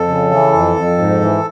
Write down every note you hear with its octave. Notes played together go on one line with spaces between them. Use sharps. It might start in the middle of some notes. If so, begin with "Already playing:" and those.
Already playing: F2 A4
C#3
E3
F2
F2
G#2
E3